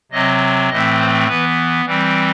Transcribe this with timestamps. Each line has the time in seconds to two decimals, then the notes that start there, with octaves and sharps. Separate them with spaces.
0.12 C3 F#3 C4 D#5
0.69 A2 E3 A3 C4 D#5
0.98 C5
1.28 E3 B3 B4
1.85 E3 G3 C4